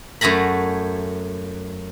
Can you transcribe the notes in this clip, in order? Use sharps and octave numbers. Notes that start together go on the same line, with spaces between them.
F#2 A3 G#5 A#5 B5